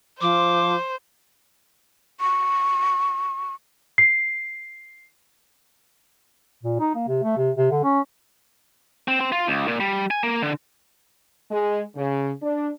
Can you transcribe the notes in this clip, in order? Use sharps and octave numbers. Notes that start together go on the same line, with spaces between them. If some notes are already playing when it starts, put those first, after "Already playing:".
F3 C5 D6
C#6
C7
A#2
D#4
A#3
C3
A3
C3
C3
D3
C#4
C4
C4
F4
C#2
A#2
G3
G#5
A#3
D3
G#3
C#3
D4